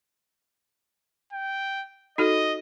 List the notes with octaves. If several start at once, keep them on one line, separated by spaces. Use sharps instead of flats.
G5
D#4 F#4 A4 D#5